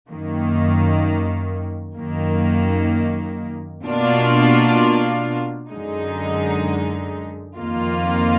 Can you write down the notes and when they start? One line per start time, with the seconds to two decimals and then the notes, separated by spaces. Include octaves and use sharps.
0.10 F#2 D#3 A#3
1.97 F#2 D#3 A#3
3.84 B2 A#3 D4 F4
5.70 F#2 D3 G#3 D#4
7.57 F2 D#3 A#3 F4